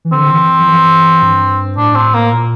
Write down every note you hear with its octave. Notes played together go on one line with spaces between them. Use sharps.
E3
D3 C4
E3
F3
E3
G2
A2 D4
C4
A#3
A#2